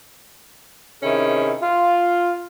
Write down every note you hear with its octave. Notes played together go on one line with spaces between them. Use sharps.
C3 D#3 C#4 E4 G#4
F4